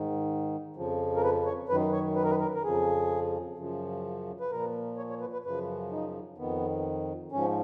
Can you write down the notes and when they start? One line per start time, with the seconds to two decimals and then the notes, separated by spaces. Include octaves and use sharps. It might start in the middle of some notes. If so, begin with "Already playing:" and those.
Already playing: G#2 D#3
0.76 F2 C#3 F3
1.16 A#4
1.23 B4
1.46 C#5
1.69 F#2 D#3 B4
1.93 C#5
2.16 B4
2.24 A#4
2.30 B4
2.40 A#4
2.55 A#4
2.63 F2 C#3 F3 G#4
3.57 F#2 C#3 F3
4.40 B4
4.50 A#2 F3 A#4
4.98 C#5
5.10 C#5
5.20 B4
5.33 B4
5.45 F#2 C#3 F3 B4
5.92 D#4
6.38 F2 D#3 B3
7.32 G#2 F3 C#4